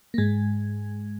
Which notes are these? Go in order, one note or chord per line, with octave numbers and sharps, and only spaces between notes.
A#3
G#2 G#3